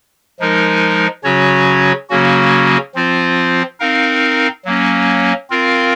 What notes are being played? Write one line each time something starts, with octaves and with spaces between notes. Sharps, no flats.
F3 G#3 D#4 A#4
C#3 F#3 C#4 F#4 C#5
C#3 F#3 A#3 C#4 F#4
F3 C4 F4 C5
C4 D#4 A#4 F5
F#3 A#3 C#4
C4 F4 A#4 F5